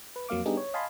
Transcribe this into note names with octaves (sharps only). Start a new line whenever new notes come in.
B4
F2 F#3 A#3 F5 D6
G3 B3 D4 D#4 G4 G#4
C#5
D#5 F5 G#5 A5 B5 C6